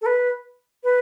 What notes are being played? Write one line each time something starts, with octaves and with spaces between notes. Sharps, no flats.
A4
B4
B4